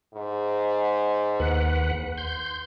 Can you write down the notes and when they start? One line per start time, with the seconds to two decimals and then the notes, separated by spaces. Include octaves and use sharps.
0.14 G#2
1.40 D#2 B4 F#5
2.18 C6 G6